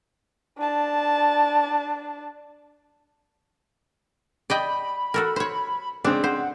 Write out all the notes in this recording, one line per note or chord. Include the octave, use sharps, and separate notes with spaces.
D4 A5
D5 D#5 G5 B5
F#4 A4 A#4
C5 C#5
C#3 G#3 C4 D4
C5 F#5